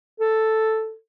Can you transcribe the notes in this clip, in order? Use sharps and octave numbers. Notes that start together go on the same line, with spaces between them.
A4